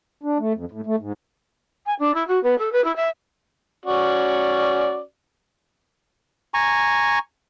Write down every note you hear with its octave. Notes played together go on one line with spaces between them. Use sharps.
D4
A3
F2
A2
A3
G#2
G#5
D4
E4
F#4
B3
A4
B4
E4
E5
C#4 F#4 D5
G#5 A#5 C#6